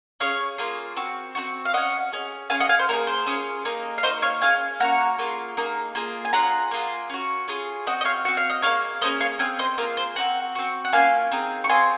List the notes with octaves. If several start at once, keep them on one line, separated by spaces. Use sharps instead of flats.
C#4 G#4 C#5 F5
A#3 F4 G#4
C4 F#4
C4 D#4 F#4
F5
C#4 F#4 D#5 F#5
C#4 G#4
C#4 F4 G#4 F5 G#5
D#5 F#5
F5 G#5
C5
A#3 D#4 G#4 A#4
C5
C#4 F4 G#4
A#3 D#4 G#4
F5
A#3 D#4 F#4 C5 D#5
C#5 F5
C#4 F4 G#4 F5 G#5
A#3 C#4 F#4 F#5 A#5
A#3 F4 G#4
A#3 D#4 G#4
A#3 F4 G#4
G#5
C#4 F4 G#4 F#5 A#5
A#3 F4 G#4
C#4 F#4
C#4 F4 G#4
C4 F#4 D#5 F#5
D#5
C#5 F5
C4 F#4 F#5
F5
D#5
A#3 F4 G#4 C#5 F5
A#3 C#4 G#4 C5 D#5
C#5 F5
C4 D#4 G#4 F5 G#5
C5 D#5
A#3 F4 G#4 A#4
C5
C4 D#4 F#4 F#5 A#5
C4 F#4
F#5
A#3 C#4 F4 F5 G#5
C4 D#4 G#4
C#6
C4 F4 G#4 G#5 C6